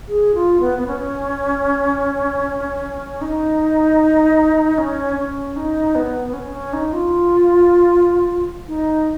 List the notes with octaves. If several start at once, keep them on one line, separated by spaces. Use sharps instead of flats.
G#4
F4
B3
B3
C#4
D#4
C#4
C#4
D#4
B3
C#4
C#4
D#4
F4
D#4